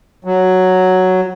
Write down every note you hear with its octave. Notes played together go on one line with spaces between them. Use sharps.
F#3